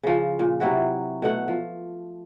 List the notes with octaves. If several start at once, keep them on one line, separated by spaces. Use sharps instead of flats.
C#3 F3
A#2
C3 F#3 E4 F#4
B2 A3 F#5
F3